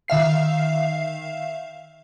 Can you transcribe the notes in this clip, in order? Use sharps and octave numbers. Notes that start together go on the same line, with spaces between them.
D#3 E5 F5 C7